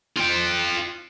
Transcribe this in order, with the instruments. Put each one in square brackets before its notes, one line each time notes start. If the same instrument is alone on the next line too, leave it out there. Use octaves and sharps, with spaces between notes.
[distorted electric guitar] F4 G5